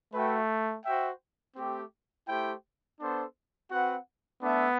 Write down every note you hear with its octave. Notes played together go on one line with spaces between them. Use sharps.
A3 F#4 B4 E5 G5
F#4 C5 E5 G5
A3 C4 G4
A3 E4 G4 C5 G5
B3 D4 A4 C5
C4 F#4 B4 F#5
A3 B3 D4 A4 E5